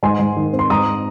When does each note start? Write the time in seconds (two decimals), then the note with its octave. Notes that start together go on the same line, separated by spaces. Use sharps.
0.03 G#2 G#5 C6
0.19 G#2
0.37 D#3
0.53 C4
0.59 C6
0.70 G#2 A#5 D#6